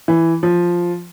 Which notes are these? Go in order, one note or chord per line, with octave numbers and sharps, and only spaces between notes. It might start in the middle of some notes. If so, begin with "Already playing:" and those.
E3
F3